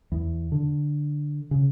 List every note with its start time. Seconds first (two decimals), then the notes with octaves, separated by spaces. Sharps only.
0.12 E2
0.52 D3
1.51 C#3